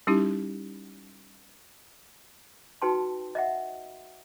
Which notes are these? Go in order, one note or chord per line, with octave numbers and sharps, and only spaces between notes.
G3 C#4 D#4 E4 G4
D#4 F#4 B4 G5 A5 C6
D#5 E5 F#5